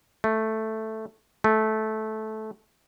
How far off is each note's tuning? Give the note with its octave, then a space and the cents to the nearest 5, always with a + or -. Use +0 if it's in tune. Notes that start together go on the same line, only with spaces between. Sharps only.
A3 +0
A3 -15